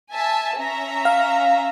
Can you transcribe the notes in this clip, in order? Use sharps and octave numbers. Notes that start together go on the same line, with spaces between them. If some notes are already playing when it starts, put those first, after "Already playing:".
E5 G#5 A5
C#4 E5 A#5
F5